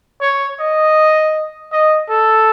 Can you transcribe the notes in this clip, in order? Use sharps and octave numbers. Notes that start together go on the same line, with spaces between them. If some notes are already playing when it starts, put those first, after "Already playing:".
C#5
D#5
D#5
A4